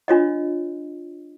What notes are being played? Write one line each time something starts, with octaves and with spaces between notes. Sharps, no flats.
D4 F4 C#5 D#5